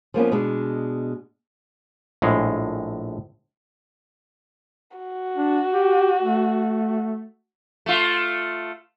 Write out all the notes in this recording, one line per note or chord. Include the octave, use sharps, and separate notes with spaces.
F3 A#3 B3 C#4
B2 G#3 D4
A#1 A2 G#3
F#4
D4
G4
A3
A3 F4